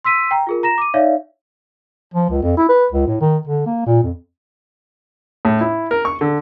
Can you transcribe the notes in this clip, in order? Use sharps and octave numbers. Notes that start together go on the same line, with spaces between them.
C6 E6 B6 D#7
G5 A#5
F4 G#4 A#4
A#5 A#6 E7
D6 D#7
D#4 C#5 D5 E5 F5
F3
C#2
F2
E4
B4
C#2
A2
D#3
D3
A#3
A#2
F2
A2
E4
A#4
C#6
D3